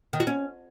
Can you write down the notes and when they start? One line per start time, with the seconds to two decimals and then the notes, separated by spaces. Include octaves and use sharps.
0.13 D#3
0.20 F#4
0.27 C#4